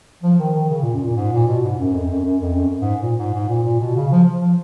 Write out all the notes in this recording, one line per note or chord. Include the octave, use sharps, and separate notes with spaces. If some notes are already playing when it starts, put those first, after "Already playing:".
F3
D#3
D#3
C#3
A#2
F#2
A#2
G#2
A#2
B2
G#2
F#2
F2
F#2
F#2
F2
F#2
G#2
A#2
G#2
G#2
A#2
A#2
B2
C#3
F3
F3